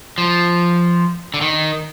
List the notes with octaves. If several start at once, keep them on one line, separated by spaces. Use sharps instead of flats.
F3
D3
D#3